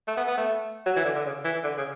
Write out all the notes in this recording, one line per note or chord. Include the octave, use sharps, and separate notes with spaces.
A3
B3
B3
A3
F#3
E3
D3
D3
C#3
E3
D3
C#3